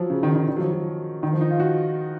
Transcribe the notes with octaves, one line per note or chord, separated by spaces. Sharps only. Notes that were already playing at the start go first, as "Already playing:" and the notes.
Already playing: F3 F#3
C#3
D#3
D#3
D#3
F#3
F3
F#3
D#3
F3
D#4
F4
F#4